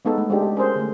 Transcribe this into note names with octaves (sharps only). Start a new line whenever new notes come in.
G#3 B3 D#4 A4
A3
G#3 C#4 D4 G4
G4
C#4 G#4 A#4 C5
D3 A3